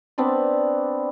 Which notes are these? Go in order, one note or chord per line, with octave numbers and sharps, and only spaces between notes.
B3 C4 D4 D5